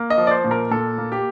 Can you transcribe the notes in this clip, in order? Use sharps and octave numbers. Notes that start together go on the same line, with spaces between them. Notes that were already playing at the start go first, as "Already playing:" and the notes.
Already playing: A#3
D#5
F3
D5
C5
A#2
A#4
A#2 A4
A#3
G4